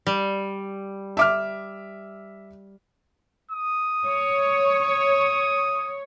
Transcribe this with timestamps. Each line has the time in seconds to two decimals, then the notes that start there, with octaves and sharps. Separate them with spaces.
0.07 G3
1.17 E5 D6 F6
3.51 D#6
4.07 C#5